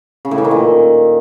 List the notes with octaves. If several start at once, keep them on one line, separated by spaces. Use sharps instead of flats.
C#3
A2
E3
D#3
A#2